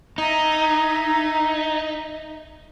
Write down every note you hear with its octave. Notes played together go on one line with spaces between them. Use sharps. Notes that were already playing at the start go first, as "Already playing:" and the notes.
D#4 E5 A#5 G#6